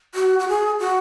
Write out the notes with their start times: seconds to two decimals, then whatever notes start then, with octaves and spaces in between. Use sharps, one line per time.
0.15 F#4
0.39 F#4
0.48 G#4
0.80 F#4